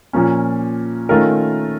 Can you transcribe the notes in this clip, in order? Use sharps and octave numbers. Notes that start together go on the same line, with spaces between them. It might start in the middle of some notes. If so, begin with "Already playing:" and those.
A#2 F3 A#3 C#4
D#3 A3 C#4 F4 A#4